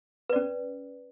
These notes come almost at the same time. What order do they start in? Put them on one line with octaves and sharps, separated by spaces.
B4 D5 C#4